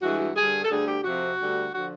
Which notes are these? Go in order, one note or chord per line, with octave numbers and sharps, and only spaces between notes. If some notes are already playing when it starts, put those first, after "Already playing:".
G2 E3 G#3 F#4
F#4
G2 D3 G3 G#4
A4
D2 D3 G3 G#4
G4
F2 C3 F3 F#4
D2 D3 G3
D3 F3 F#4